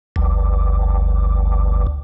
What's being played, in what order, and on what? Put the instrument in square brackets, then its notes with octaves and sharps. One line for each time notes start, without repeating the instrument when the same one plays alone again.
[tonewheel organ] G1 D2